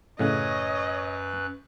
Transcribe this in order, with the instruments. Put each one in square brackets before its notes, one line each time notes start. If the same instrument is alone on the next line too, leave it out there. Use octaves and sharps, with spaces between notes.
[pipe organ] F#2 B4 F#6 [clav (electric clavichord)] A2 C#3 C#4 [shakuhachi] C#5 [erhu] D#5